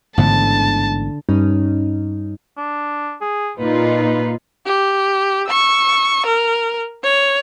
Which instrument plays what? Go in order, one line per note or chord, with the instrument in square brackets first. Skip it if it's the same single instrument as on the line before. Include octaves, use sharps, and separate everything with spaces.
[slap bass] A1 G#2 B3 [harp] D3 [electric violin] A5
[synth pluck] G2 G3 C#4 D#4
[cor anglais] D4
G#4
[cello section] A#2 D#4 F4 [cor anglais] B4
[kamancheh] G4
C#6 E6
A#4
C#5